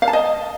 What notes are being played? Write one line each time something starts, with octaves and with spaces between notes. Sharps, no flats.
F5
A5
D#5